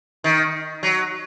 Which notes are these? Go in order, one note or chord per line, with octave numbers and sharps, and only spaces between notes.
D#3
F#3